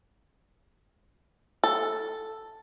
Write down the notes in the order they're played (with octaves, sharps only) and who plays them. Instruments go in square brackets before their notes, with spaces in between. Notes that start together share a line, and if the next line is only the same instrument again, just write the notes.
[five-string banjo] A4